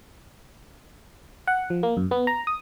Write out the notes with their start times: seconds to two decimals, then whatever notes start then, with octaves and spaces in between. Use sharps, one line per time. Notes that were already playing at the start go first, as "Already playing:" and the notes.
1.47 F#5
1.70 F3
1.83 A#3
1.97 F#2
2.11 B3
2.27 A#5
2.47 D#6